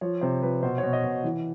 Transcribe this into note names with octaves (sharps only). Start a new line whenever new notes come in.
F3 C#5
C3 C5
F3 B4
B2 C5
C#5
B2
D#5
B2
E3